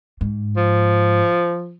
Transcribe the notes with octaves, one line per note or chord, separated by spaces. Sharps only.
G#2
F3